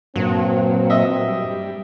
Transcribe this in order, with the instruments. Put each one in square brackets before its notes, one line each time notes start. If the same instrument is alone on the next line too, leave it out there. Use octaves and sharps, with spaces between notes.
[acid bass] G2 [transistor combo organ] A#2 F#3 [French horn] C4
[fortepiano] D#5 E5
[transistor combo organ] G3